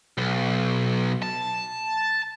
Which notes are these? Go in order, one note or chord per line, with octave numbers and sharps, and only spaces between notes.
B1
A5